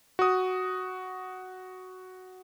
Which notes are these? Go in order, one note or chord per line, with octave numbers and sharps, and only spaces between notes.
F#4 D#6